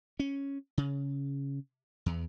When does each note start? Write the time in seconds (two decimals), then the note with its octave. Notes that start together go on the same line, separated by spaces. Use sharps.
0.20 C#4
0.78 C#3
2.06 E2